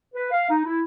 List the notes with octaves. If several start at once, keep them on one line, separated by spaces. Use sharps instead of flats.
B4
F5
D#4
E4